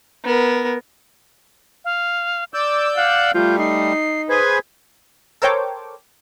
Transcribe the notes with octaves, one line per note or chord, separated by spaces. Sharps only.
B3 A#4
F5
D5 D6 E6 G6
F5 F#5
G3 A3 F4 G6
D#4 C7
G#4 B4 C5 G#6
A4 A#4 C5 C#5 G5 D6